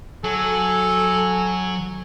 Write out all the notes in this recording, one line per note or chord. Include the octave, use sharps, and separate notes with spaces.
F#3 A4 G#5